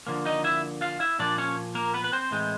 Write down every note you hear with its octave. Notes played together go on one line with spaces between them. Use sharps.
D3 F3 A#3
D#4 D#5
E4 E5
F4 F5
E4 E5
A#2 F3 A#3 D4 D5
C#4 C#5
A#3 A#4
B3 B4
B4
C4 C5
A2 E3 G#3